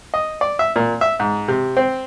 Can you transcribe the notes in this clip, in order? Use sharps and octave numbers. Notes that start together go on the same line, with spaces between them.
D#5
D5
E5
A#2
E5
G#2
C3
C4